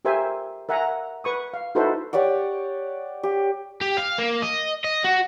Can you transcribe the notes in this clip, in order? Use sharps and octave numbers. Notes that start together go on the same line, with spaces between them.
G4 A#4 C5 E5 G#5
A#4 E5 F#5 G#5 A#5
B4 C#6 D#6
F5
D#4 E4 F#4 A4 B4 C5
G4 C#5 D5 F#5
G4
G4
F5
A#3
D#5
D#5
F#4